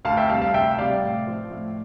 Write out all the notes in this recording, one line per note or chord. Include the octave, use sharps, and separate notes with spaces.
D2 F5 A5
E5 G5
C3 G3 F5 A5
F5 A5
D2 E5 G5
C3 G3 D5 F5
A2
F3
A2